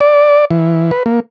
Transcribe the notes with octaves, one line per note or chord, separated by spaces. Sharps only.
D5
E3
B4
A#3